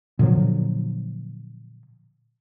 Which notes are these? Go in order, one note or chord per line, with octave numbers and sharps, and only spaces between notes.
A#2 D3 F3 F#3